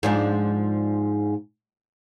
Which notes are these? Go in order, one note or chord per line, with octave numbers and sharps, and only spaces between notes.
G#2 F3 D4